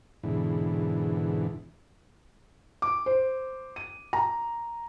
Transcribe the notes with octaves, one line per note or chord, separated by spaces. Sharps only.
E2 G#2 B2 D3 E3
D6
C5
D#7
A#5